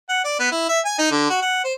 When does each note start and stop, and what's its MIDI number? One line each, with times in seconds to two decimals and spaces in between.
0.09 0.22 78
0.24 0.38 74
0.39 0.52 59
0.52 0.68 64
0.69 0.79 76
0.85 0.94 80
0.98 1.06 63
1.11 1.29 50
1.30 1.38 66
1.42 1.62 78
1.64 1.73 72